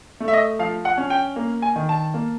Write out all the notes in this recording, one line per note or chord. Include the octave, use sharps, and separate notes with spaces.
A3
E5
D#5
F3 F5
F#5
C#4
G5
A#3
G#5
D#3
A5
A#3